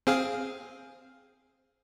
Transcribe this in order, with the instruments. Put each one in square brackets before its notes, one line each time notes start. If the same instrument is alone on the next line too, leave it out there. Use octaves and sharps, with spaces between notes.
[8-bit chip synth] C4 G#4 F5